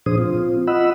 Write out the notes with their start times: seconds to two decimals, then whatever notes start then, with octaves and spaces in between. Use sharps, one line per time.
0.06 A#2 F3 D4 G#4 C5 D#6
0.18 C4 F4
0.67 F4 D#5 F#5 B5 E6